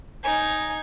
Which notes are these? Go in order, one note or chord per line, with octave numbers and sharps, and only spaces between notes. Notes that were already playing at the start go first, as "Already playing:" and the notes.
D#4 G#5